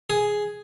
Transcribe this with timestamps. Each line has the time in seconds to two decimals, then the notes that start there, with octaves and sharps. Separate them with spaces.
0.10 G#4